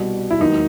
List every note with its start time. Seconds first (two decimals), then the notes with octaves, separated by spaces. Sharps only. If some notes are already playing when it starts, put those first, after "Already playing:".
Already playing: C2 B2 G3
0.31 E4
0.40 E1 D#2 D#3 F#3 D#4